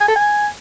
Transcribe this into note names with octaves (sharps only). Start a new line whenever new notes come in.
G#5
A4
G#5